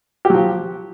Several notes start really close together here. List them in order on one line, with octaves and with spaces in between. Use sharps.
G4 F#3 F3